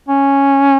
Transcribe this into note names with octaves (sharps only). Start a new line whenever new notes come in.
C#4